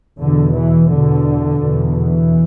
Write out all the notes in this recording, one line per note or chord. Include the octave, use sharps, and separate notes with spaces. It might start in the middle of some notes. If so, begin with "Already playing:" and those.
E2 B2 D3
E3
E2 B2 D3
E2 B2
E3